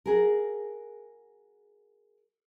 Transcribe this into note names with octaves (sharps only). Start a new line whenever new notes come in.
F#4 G#4 A#4